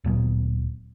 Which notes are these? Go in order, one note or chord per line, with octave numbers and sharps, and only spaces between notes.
D1 A#2 F#3 B3